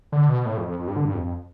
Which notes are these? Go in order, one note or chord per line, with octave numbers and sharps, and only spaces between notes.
D3
B2
A2
F2
F2
F2
G2
D3
G2
F2
F2